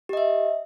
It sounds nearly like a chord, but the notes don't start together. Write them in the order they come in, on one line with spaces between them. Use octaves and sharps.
G4 D#5 E5